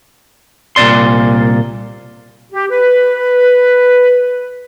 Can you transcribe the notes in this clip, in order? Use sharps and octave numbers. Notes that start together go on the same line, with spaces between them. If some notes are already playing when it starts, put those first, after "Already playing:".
C2 A#2 C#3 D5 C6
G4
B4